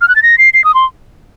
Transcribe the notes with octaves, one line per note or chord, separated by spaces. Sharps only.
F6
F#6
A6
A#6
C7
C7
D#6
C6